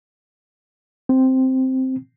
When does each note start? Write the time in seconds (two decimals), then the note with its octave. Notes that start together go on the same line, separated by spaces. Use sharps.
1.09 C4